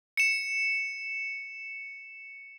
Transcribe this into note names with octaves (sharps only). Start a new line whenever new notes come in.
C#7 E7